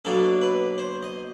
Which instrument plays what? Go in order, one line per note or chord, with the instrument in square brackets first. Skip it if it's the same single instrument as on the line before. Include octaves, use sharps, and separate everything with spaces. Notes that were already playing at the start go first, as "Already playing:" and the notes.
[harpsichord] B2 F#3 A#3 D4 A4
B4
C5
D#5